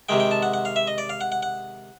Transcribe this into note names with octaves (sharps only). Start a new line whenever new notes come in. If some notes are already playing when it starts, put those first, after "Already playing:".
C3 D#3 G#3 G5
G5
A5
F#5
F#5
F5
E5
D#5
D5
F5
F#5
F#5
F#5